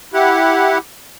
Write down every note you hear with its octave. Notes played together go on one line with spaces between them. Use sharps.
E4 G4 F#5